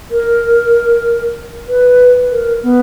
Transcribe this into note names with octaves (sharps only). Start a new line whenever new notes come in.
A#4
B4
A#4
B3